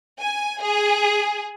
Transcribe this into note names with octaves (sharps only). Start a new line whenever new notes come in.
G#5
G#4